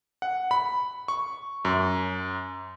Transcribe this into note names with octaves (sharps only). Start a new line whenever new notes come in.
F#5
B5
C#6
F#2